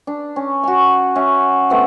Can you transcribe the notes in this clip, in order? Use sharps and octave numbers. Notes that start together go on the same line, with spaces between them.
D4
C#4
F#4 G#5
C#4 E5
A3 B3 C4